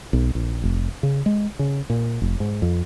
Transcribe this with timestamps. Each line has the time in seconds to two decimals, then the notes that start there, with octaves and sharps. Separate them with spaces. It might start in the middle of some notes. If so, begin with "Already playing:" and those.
0.13 B1
0.35 A#1
0.63 F1
1.03 C#3
1.26 G#3
1.59 C#3
1.90 A#2
2.22 F1
2.40 G#2
2.62 F2